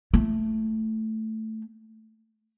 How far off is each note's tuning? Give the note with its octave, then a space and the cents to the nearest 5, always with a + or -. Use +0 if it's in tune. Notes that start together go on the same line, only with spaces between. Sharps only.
A3 +0 E4 +45